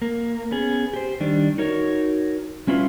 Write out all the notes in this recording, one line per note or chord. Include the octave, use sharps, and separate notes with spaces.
A#3
B3 C#4 G#4
G4 C5
D#3 G3 D4
D#4 F#4 A#4 C#5
G3 C#4 E4 F4 B4